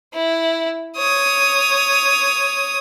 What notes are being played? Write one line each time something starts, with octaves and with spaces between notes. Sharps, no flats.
E4
C#5 D#6